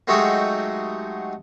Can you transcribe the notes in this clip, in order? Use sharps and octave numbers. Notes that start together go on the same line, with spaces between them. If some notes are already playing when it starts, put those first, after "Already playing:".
F#3 G#3 A3 D#4 F#4 G4